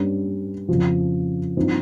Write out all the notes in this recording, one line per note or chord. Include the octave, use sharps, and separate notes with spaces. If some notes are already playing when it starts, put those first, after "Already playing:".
Already playing: G2 G3 C#4
F2 C#3 F3
G2 F3 C4 D#4